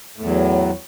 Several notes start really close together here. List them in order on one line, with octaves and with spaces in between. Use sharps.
A2 E2 F#3